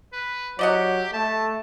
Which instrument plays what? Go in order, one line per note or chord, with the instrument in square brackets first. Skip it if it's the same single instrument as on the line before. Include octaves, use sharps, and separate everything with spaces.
[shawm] B4
[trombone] F#3 [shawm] G4 [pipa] D5 D#5 F#5
[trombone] A3 [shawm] A5